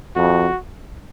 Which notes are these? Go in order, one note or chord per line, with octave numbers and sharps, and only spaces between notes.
F2 F#4